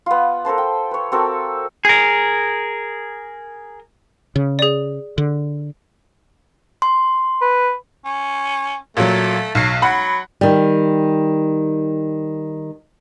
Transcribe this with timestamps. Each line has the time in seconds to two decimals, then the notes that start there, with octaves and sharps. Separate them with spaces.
0.06 B3 F4
0.45 A4 A#4 C5 A5
0.58 G5
0.91 B4 C#5
1.12 C4 F#4 A4 A#4
1.85 G#4 A#4
4.36 C#3
4.59 G#4 D5
5.18 D3
6.82 C6
7.42 B4
8.05 C#4
8.97 A#2 F#3 A3
9.55 B1 F#3 C7
9.82 F#3 F#5 B5
10.41 D#3 G3